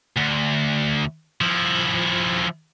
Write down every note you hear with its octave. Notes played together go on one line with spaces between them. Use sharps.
D2
F3 E4